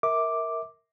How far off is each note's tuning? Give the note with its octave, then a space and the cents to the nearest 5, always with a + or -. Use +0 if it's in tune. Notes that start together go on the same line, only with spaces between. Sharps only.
A#4 +0 E5 -25 D6 +0